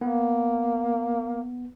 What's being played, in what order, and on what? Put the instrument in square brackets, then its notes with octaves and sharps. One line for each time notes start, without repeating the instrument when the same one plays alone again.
[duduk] A#3 [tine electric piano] B3